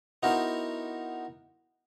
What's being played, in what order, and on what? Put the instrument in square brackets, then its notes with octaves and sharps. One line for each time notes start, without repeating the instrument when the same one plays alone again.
[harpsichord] B3 D#4 E4 F#4 A#4 C5